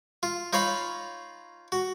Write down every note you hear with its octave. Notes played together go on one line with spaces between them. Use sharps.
F4
D#4 F4 C#5 F5 B5
F#4